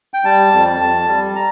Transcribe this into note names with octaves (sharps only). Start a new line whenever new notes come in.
G5
G3 A5
F2
F2 A5
G3
A#5